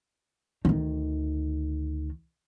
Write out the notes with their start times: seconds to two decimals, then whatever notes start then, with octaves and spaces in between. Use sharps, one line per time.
0.65 D2 D#3